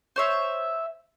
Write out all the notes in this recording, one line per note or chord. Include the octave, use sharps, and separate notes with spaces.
C5 C#5 E5